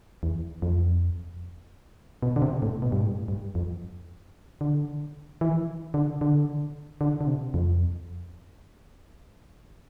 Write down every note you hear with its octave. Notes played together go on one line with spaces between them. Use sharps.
E2
F2
B2
D3
C3
A2
B2
G2
A2
G2
F2
D3
E3
D3
D3
D3
D3
C3
F2